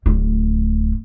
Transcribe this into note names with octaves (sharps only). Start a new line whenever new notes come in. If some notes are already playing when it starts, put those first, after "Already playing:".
D1 A2